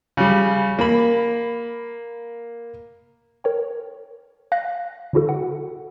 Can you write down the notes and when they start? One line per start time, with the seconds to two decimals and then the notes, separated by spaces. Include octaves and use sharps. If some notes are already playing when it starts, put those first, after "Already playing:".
0.17 C#3 G3
0.79 A#3 B5
3.44 A#4 C#5 G5
4.52 F5 F#6 A#6
5.13 D3 D4 E4 F#4 A4
5.29 F#5